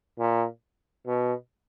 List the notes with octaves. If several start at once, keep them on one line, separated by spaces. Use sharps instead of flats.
A#2
B2